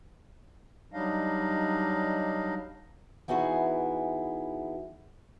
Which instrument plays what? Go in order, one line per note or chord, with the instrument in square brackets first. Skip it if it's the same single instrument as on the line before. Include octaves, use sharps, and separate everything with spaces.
[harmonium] F#3 G3 D4 D#4 D#5 F5
[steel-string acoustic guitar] E3 B3 D#4 E4 F#4 G#4